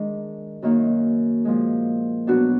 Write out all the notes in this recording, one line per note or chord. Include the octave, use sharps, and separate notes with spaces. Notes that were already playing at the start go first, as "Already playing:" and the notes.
Already playing: D#3 G#3 D4
F#2 D#3 A#3 D#4
A#2 F3 G#3
B2 F#3 B3 D4 F#4